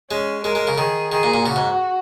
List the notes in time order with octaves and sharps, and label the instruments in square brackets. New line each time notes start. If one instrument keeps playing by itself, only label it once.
[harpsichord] G#3 [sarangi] C#4
[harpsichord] G#3 [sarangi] A#4
[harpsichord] G#3
C#3
[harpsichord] D#3 [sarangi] G#4
[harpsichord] D#3 [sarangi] G#4
[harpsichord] A#2
A#2
[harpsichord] C#3 [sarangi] F#4
[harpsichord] G#2